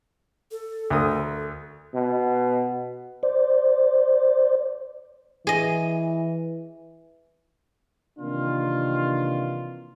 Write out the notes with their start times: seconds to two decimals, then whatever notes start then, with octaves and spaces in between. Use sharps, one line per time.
0.51 A4
0.90 D2 A#4 D#6
1.95 B2
3.23 C5 D5
5.47 E3 G#4 D#5
8.19 C3 D#3 E3 A#3 D4 F4